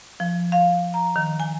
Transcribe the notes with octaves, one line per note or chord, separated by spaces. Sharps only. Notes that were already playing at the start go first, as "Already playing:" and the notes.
F3
F5
A#5
D#3
G#5